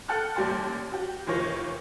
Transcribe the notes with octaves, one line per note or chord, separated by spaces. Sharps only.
A4 F#5 G5 A5 F6 F#6
A1 D#2 G3 G5 A5 C6
F#4 G4
F1 D#3 E3 F4 C#5 A#6